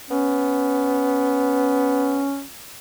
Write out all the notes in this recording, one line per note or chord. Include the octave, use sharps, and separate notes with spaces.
B3 C#4